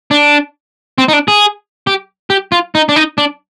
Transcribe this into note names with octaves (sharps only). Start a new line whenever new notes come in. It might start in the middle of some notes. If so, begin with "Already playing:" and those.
D4
C4
D#4
D4
G#4
G4
G4
F4
D#4
D4
D#4
D4